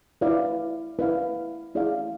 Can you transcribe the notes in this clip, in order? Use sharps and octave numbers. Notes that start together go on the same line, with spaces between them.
E4 B4 D5 F5
E4 B4 D5 F5
E4 G#4 D5 F5